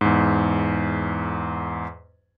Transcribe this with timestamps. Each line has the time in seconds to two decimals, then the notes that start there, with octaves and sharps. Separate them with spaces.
0.01 E2 G#2